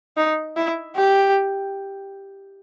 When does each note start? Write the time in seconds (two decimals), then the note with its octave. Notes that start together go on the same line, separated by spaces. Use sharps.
0.17 D#4
0.57 E4
0.96 G4